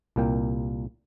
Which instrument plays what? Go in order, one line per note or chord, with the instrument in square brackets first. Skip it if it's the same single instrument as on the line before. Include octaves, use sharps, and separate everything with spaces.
[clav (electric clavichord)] C2 A#2 A#3 G5